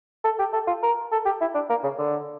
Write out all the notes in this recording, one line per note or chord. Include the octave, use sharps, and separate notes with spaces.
A4
G4
A4
F4
A#4
A4
G4
E4
D4
A#3
C#3
D3